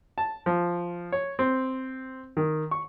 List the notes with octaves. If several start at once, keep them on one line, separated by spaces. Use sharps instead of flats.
A5
F3
C#5
C4
D#3
C#6